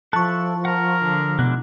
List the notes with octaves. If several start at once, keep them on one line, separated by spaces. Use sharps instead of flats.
F3 E4 A4 A5 C#6 F#6
A#4 F#5 A#5
D3
B2 G#3 D4 E4 F#6